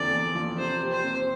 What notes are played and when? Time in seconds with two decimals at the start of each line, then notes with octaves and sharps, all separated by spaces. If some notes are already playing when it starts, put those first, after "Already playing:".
Already playing: E2 D3 F3 C4 D5
0.12 E2
0.35 F3
0.58 C3 C5
0.81 G3
0.92 C5
1.03 C4